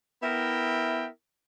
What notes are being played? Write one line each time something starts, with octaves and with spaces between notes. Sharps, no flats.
B3 E4 A#4 E5 G5